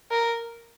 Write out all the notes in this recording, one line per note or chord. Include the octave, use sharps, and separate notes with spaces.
A#4